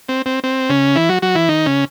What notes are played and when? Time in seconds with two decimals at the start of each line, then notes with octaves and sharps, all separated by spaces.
0.09 C4
0.26 C4
0.44 C4
0.69 C#3 C#4
0.95 E3 E4
1.09 F#3 F#4
1.22 F#3 F#4
1.35 E3 E4
1.49 D#3 D#4
1.66 C#3 C#4